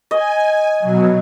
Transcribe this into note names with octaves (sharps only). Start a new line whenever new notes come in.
D#5 G#5
B2 F#3